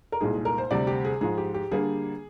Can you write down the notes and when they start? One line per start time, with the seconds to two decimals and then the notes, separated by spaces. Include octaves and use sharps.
0.12 A#4
0.21 C2 A#2 G#3 D#4 G#4
0.33 G#4
0.45 A#4
0.58 C5
0.71 D2 C3 G3 D5
0.87 G4
1.05 G#4
1.21 G#2 F3 G#3 G#4
1.38 G4
1.54 G4
1.71 D3 G3 A#3 D4 G#4